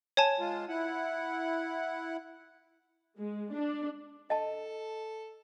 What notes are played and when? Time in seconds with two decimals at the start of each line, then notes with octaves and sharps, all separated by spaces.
0.17 C#5 G#5 A5
0.39 G#3 F4
0.68 E4 F#5
3.16 G#3
3.52 D4
4.30 A4 D#5 A5